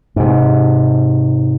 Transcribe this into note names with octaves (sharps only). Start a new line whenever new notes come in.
G#2 C3